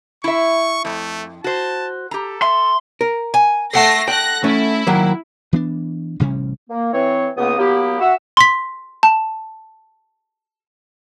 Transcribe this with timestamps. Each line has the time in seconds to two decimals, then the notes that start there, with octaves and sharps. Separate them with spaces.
0.24 E4 E5 C#6
0.85 F2 A3
1.44 F#4 C5 A5
2.11 G4 A4 A#5
2.42 E5 C6
3.01 A#4
3.34 G#5
3.73 A3 A4 F#5 A5 A#6 C7
4.08 G5 F#6 A#6
4.44 A3 C#4 E4
4.87 D#3 F#3 A#3
5.53 E3 B3 D4
6.20 A1 C3 G3 C#4
6.70 A#3
6.93 E3 C4 C#5
7.37 C#2 A#3 B3 D#6
7.58 F#3 A#3 B3 E4 G4
8.00 F#4 E5 F#5 E6
8.37 C6 B6
9.03 A5